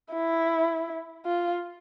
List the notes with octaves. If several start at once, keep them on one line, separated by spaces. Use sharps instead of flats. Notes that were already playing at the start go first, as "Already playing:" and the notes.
E4
F4